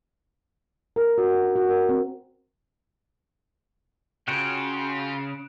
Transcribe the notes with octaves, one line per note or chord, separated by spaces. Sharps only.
A#4
F#4
D4
F#4
A#4
C4
C#3 F4 F#4 G5 F#6 D7 E7